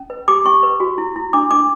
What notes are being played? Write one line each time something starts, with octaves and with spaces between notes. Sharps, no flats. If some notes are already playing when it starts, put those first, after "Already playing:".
Already playing: C#4
B4
G4 D6
C#4 C#6
B4
F#4
E4
E4
D4 D6
D4 D6